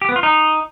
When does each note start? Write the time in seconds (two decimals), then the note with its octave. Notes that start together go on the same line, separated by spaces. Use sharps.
0.02 G4
0.09 B3
0.16 F4
0.23 D#4